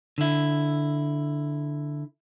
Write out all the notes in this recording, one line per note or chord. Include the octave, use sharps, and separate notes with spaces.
D3 E4